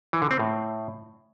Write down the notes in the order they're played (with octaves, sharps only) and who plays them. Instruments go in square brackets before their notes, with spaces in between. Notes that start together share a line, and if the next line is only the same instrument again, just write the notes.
[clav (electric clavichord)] E3
D3
C4
A2